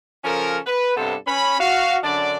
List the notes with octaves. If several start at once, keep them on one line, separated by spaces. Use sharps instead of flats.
C#3 F3 C#4 A4 A#4
B4
G2 C3 B3 A4 C5
C#4 B5
F#4 F5
F#2 D3 D4 D5